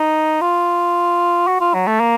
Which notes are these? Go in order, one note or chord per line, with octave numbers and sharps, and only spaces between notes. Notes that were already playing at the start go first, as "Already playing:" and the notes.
Already playing: D#4
F4
F#4
F4
F#3
A3
A#3